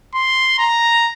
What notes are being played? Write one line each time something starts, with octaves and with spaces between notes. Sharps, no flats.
C6
A#5